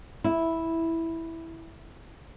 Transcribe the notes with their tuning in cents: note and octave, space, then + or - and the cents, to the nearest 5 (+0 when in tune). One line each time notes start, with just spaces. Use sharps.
E4 -5